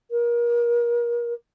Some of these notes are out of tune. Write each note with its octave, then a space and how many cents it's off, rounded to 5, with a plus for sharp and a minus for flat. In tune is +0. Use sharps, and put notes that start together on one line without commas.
A#4 +30